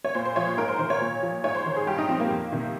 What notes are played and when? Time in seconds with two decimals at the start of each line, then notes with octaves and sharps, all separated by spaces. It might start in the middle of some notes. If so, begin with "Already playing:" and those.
0.04 C#5
0.15 A#2 C5
0.25 C5
0.36 F3 C#5
0.47 C5
0.57 G#2 A#4
0.68 C5
0.79 D#3 C5
0.90 C#5
1.01 A#2
1.23 F3
1.44 G#2 C#5
1.55 C5
1.66 D#3
1.77 G#4
1.87 G2 G4
1.98 D#4
2.08 F3 C4
2.20 A#3
2.30 F2
2.52 C3 D#3